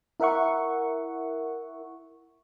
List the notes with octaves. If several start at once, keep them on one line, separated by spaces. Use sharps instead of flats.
E4 A#4 E5 F#5 C#6